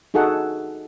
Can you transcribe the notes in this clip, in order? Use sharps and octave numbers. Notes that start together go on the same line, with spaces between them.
D#4 F#4 G#4 A4 F#5